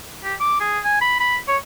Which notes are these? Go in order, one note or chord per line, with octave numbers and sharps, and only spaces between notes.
G4
D6
G#4
G#5
B5
B5
C#5